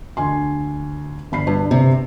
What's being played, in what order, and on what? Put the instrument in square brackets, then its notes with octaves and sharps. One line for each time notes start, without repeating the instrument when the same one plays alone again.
[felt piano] D2 G#5 C6
G1 B5 C7
[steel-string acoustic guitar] G2
C3